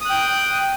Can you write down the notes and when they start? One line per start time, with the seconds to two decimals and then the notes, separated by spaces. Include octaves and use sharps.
0.01 D#6
0.05 F#6
0.10 G5